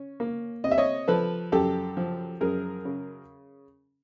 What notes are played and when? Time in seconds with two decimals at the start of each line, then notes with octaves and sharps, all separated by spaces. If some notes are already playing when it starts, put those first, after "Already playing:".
Already playing: C#4
0.20 A#3
0.64 C3 D#5
0.71 E5
0.78 C#5 D#5
1.08 F3 A4 B4
1.52 F#2 G4 A4
1.97 F3
2.41 F#2 G#4 A#4
2.85 C#3